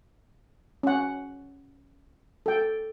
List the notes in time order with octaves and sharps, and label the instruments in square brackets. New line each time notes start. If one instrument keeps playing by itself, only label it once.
[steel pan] C#4 F#5
A4 G5